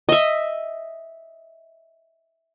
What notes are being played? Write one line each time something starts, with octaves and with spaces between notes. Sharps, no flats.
D#5 E5